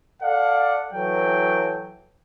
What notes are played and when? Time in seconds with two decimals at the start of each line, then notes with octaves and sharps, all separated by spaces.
0.22 A4 D5 F5 F#5
0.92 E3 F#3 A4 G5